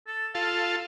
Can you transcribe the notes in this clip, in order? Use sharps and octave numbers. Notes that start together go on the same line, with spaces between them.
A4
F4 A4 F5